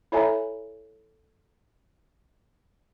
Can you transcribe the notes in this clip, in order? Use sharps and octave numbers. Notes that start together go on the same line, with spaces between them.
E4 A4 C#5 E5 G#5 A#5